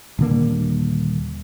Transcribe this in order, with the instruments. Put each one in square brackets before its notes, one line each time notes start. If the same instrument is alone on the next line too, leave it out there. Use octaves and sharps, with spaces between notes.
[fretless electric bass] D#1 D3 A#3